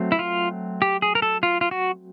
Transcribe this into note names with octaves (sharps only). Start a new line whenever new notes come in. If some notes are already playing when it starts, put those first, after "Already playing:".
Already playing: F#3 A3 C4
E4
F4
G4
G#4
A#4
A4
F4
F4
F#4